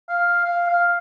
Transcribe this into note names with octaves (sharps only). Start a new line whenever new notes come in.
F5
F5
F5